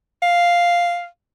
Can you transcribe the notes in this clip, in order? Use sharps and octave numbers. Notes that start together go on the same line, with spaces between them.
F5